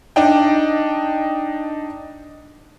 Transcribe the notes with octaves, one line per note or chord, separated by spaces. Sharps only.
D4 D#4 D#5 G5